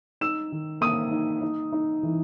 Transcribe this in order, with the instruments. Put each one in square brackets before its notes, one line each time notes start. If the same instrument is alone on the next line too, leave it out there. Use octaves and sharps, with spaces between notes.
[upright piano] D#4 E6 E7
D#3
A#3 D#6 D#7
D#4
D#4
D#4
E3